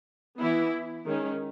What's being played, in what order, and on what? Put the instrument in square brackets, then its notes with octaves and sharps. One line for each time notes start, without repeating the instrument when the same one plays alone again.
[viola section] E3 B3 E4
D#3 G#3 C#4